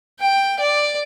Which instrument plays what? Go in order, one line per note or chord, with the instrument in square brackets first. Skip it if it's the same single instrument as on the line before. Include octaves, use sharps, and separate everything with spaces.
[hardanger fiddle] G5
D5